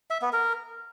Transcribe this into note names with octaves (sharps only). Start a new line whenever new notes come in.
E5
B3
A#4